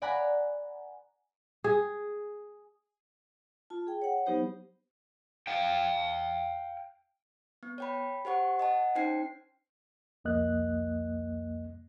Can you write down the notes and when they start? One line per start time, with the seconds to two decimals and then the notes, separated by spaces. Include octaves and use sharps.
0.02 D5 F#5 G#5 A#5 B5 F#6
1.64 G#4
3.70 F4 A5
3.87 G#4 G5
4.02 C#5 F#5
4.26 F#3 B3 D#4 G4 C5
5.47 F5 G5
7.63 B3
7.78 C#5 G5 B5
8.25 G4 C5 F#5 C#6
8.59 D#5 F#5 A5
8.95 C#4 D#4 C5 G5 C7
10.24 C2 F2 A#3 D#5 F#6